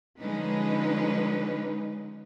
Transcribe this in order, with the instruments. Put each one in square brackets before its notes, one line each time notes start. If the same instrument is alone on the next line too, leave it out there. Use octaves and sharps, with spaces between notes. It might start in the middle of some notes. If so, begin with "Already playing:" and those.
[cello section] D3 F3 G#3 C#4 D#4 B4